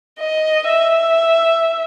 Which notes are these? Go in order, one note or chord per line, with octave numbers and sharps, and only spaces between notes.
D#5
E5